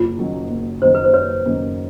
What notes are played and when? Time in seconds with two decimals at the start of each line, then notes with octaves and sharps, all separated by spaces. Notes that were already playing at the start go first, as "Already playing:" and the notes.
Already playing: F#1 F4
0.17 F#2 D#3 F#3 A#3
0.50 F#1
0.82 F#2 D#3 F#3 A#3 C5
0.95 B4
1.04 C5
1.14 F#1 B4 C#5
1.45 F#2 D#3 F#3 A#3